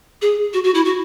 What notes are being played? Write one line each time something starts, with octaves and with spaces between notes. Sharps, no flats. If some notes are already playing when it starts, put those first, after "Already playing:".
G#4
F#4
F#4
E4
F#4